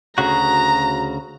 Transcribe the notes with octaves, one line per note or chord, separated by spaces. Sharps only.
D2 C#3 F#4 A#5